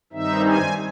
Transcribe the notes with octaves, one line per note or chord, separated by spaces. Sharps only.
G2 D#3 G3 C4 D#4 E5
G#5